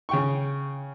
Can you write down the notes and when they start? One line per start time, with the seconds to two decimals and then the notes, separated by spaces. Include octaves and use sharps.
0.09 C#3 G5 C#6